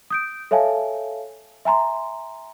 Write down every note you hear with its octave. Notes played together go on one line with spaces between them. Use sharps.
D#6 G6 D7
A4 C#5 E5 F5 G#5 A5
E5 G#5 A#5 C6